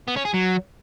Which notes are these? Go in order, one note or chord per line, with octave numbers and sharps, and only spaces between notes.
B3
C#4
G#4
F#3